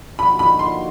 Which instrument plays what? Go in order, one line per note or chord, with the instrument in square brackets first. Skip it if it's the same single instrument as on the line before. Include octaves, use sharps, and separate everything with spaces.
[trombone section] D3 F3 A#3 D#4 F#4 [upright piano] B5
[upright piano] B5
C6